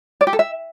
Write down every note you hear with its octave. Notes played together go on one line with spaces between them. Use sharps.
D5
G4
A4
E5